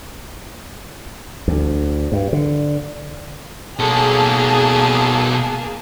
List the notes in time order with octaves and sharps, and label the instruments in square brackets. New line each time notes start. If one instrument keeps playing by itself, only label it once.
[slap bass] D2
G2
D3
[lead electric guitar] B2 A4 [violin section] A#3 G#4 A5